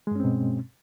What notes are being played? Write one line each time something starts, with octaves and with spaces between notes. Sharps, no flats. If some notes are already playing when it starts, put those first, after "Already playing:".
G2 B2 G#3 C4 C#4